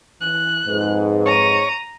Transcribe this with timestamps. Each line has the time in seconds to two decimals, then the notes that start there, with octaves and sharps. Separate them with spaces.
0.21 E3 F#6
0.66 F2 G#2 B4
1.26 C#5 A#5 C#6 D#7